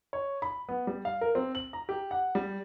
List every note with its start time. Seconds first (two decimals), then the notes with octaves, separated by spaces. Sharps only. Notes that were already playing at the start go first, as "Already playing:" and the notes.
0.13 C#5
0.42 B5
0.69 B3
0.87 G3
1.05 F5
1.21 A#4
1.35 C4
1.55 F#7
1.73 A#5
1.89 G4
2.11 F#5
2.35 G3